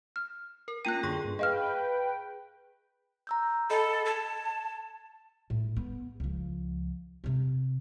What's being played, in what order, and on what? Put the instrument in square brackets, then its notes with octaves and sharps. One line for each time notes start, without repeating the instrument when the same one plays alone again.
[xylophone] F6
[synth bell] A#4
[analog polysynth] A#3 C#4 A#6 [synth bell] F4 G5 [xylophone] F#6 D#7
[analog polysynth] F#2 D3 C6 [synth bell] G#4 G5 C#6
[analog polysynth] G2 A#2
[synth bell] G#4 [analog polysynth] B4 G5 [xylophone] D#5 F5 F6
[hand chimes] A#5 E6 G6
[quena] A4 [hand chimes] D#5 G5 B5
[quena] A5 [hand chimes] G#6 A6
[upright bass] A2
B3
C#2 F3
C3 C4